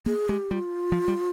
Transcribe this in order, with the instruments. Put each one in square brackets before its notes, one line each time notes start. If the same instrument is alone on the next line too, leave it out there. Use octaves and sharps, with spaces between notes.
[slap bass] A#3 [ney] G#4
[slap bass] G#3 [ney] G4
[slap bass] G3 [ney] F4
[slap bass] F3
G3